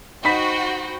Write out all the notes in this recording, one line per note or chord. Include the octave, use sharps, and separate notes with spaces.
D#4 F#4 C5 G5 B5 B6